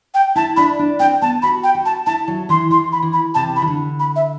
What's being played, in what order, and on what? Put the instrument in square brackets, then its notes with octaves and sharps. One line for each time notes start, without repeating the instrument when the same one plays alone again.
[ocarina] G5
[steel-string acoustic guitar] E4 [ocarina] A5
[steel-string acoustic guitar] D4 [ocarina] B5
[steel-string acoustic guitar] D4
[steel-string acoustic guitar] C4 [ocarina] G5
[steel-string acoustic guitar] B3 [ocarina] A5
[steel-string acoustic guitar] F#4 [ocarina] B5
[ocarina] G5
[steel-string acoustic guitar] F#4
[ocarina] A5
[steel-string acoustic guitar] E4 [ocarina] A5
[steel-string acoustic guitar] F#3
[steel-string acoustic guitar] E3 [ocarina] C6
[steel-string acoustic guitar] E3 [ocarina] C6
[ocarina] B5
[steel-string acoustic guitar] E3
[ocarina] B5
[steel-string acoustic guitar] C3 [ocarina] A5
[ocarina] B5
[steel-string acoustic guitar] E3
D3
[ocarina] B5
E5